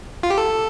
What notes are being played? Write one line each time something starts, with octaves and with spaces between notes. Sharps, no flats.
F4
G4
A4